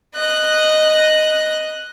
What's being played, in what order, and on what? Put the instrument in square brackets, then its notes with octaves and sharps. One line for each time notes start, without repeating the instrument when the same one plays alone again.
[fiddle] D#5 F#6